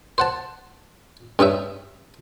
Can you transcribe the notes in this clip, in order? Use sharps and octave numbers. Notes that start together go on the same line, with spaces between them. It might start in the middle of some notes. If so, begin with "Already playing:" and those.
C5 F#5 A5
G2 C#4 D#4 E5